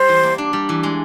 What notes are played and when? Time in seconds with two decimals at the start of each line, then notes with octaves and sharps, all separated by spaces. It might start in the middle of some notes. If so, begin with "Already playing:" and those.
Already playing: G3 C5
0.09 E3
0.23 A#3
0.38 D4
0.53 G3
0.69 E3
0.83 G#3